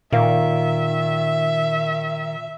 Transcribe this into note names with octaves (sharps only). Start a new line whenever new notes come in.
A#2 D#3 A#4 E5 F5